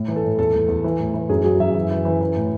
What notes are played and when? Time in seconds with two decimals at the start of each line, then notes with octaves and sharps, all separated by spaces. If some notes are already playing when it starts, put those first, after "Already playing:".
Already playing: A2
0.08 E3
0.16 A4
0.24 A2
0.39 E2 A4
0.54 E2
0.68 E2
0.84 E3
0.99 A2
1.14 E3
1.29 F#2 G#4
1.44 F#3 G#4
1.60 F#2 E5
1.75 E3
1.91 E3
2.05 E3
2.21 E3
2.36 A2